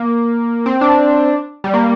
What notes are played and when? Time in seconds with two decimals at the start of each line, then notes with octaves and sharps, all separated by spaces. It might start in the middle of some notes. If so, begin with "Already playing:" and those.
Already playing: A#3
0.66 C4
0.81 D4
1.64 G3
1.74 A#3